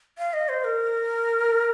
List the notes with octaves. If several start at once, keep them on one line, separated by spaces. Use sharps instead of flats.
F5
D#5
C5
A#4